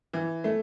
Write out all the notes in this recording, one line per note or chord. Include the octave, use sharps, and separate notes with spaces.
E3
A3